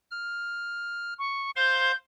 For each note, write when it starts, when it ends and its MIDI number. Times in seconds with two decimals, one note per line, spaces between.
0.11 1.14 89
1.19 1.51 85
1.56 1.92 72
1.56 1.92 77
1.56 1.92 84
1.56 1.95 91